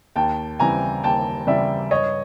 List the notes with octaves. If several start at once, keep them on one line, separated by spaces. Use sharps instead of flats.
D#2 G5 A5
C#3 E3 G3 C4 G#5 A#5
D#2 G5 A5
C#3 E3 G3 C4 D5 E5
G2 C#5 D#5